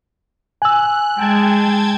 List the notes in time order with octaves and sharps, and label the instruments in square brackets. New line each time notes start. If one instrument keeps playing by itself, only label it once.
[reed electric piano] G#5 E6 [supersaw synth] F#6
[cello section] G#3 [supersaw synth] G5 A5 G#6